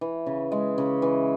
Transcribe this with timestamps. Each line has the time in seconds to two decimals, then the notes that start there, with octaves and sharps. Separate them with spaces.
0.01 E3
0.26 C#3
0.52 G#3
0.78 C#3
1.02 E3